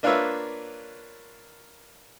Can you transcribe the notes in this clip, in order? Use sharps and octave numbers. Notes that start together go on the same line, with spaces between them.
A#3 D4 F4 B4 C#5 E5